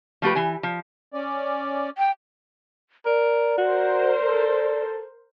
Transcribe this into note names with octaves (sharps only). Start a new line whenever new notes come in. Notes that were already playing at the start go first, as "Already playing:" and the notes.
F3 A3 G4 B4
E3 G#5
F3
C#4 D5
G5
A#4 D5
F#4 A#4 C5
A4